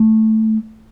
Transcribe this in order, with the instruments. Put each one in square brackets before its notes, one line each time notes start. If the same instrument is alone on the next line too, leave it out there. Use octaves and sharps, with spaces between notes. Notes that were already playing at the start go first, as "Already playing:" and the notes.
Already playing: [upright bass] A3